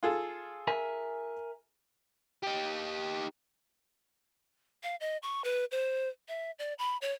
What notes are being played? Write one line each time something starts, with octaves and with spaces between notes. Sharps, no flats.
F4 G#4 A4
A#4 E5 G#5
D#4 G4
F5
D#5
C#6
B4
C5
E5
D5
B5
C#5